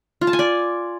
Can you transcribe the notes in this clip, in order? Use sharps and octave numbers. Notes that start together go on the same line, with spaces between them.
F4
A5
G#5
D5